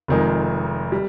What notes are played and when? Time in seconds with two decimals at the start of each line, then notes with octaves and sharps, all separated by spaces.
0.08 F1 F2 D#3 G#3
0.92 G3